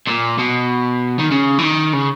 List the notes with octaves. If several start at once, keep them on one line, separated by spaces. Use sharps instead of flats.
A#2
B2
D#3
C#3
E3
D#3
C#3